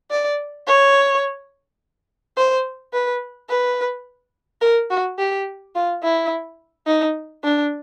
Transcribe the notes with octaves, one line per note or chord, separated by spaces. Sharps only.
D5
C#5
C5
B4
B4
A#4
F#4
G4
F4
E4
D#4
D4